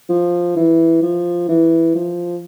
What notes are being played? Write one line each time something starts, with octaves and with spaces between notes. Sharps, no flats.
F3
E3
F3
E3
F3